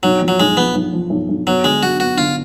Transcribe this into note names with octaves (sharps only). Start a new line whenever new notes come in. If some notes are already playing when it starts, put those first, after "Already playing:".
B1 F#3
F3
F#3
B1 G#3
F3 B3
B1
F3
B1
B1
F#3 B3
D3 G#3
F#3 F#4
B3 F#4
D3 F4